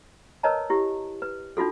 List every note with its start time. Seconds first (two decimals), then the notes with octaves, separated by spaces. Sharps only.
0.43 A#4 B4 C#5 D#5 A5 A#5
0.70 E4 G4
1.22 B4
1.57 D4 D#4 F4 F#4 A4